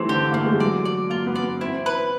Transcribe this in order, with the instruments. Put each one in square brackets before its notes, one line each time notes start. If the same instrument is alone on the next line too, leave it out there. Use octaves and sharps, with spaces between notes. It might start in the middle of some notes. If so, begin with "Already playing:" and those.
Already playing: [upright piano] E3 G3 A3 [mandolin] C4
[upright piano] D3 [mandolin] G4
[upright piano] A#3
[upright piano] A3 [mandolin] C4
[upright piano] G#3
G3
[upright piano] F#3 [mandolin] D5
[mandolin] D5
[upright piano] A#3 [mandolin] F4
[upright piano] B3
[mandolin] D5
[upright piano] B3
[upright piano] C4 [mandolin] E4
[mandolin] B4